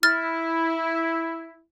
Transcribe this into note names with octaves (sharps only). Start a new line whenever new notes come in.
E4 F6 A6